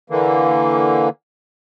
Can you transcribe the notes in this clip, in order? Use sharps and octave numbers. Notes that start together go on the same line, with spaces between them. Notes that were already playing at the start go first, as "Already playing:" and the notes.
D3 E3 A#3